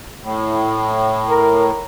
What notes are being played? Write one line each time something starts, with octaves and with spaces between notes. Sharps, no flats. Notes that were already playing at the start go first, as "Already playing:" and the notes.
A2
A#4